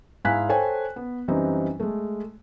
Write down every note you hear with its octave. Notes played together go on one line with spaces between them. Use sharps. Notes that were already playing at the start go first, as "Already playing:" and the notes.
G#2 E4 F5 G#5 F#6 B6
A4 C5 C#5 G5 G#5
B3
F#2 E3 G3 C4 D#4
G#3 A3